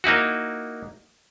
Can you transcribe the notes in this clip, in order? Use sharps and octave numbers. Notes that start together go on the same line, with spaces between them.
A#3 D#4 E4 F#4